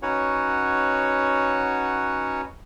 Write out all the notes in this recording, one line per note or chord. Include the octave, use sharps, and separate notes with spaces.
C#4 D#4 F#4 B4 C#5 F#5